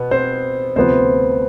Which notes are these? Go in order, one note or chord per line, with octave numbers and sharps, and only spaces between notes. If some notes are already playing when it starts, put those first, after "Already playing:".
Already playing: B2 B3
C4 C5
D2 C3 F3 B3 C4 C5